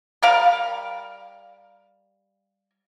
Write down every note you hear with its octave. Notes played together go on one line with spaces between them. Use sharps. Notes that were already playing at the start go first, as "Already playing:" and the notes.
G3 A#4 F5